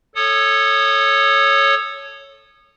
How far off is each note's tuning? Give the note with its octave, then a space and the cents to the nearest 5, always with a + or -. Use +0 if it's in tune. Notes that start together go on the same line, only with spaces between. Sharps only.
A4 +0 C#5 +0 D#6 -25